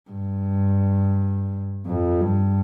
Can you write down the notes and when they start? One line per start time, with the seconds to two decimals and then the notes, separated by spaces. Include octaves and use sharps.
0.11 G2
1.86 F2
2.21 G2